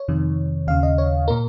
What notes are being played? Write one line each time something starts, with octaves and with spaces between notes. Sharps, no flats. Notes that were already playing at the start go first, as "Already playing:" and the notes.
Already playing: C#5
F2 C3 D#3
D#2 C#3 F5
D#5
C#5
A#2 A#4